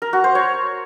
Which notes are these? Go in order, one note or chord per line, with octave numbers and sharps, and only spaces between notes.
A#4
F#4
C5
C#5